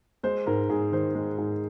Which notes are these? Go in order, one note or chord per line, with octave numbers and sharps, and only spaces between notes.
G#3 C5
G#2 A#4
G#2 G#4
D#3 C5
G#3
G#2